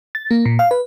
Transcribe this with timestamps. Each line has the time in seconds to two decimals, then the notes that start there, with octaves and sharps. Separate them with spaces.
0.15 A6
0.31 A#3
0.46 A#2
0.59 F5
0.71 B4